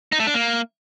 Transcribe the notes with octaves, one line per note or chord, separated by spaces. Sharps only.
D#4
A3
D4
A#3